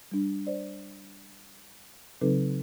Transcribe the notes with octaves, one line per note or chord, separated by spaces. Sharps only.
G3 D4
C5 D5
C#3 F#3 C4 D#4 A4 B4